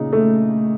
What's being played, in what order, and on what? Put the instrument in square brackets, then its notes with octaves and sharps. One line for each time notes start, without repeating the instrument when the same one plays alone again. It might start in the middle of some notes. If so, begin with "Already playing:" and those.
Already playing: [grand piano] A#2 C#3 [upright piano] D#4
[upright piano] A3